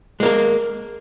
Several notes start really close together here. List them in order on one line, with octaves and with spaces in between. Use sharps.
G#3 A#3 A#4